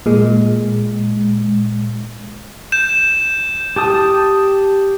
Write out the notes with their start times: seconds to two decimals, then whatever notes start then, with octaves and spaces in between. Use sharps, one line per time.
0.06 A#2 G#3
2.72 G6 E7
3.76 G4 A5 D#6